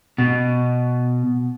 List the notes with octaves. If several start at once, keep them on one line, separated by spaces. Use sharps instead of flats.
B2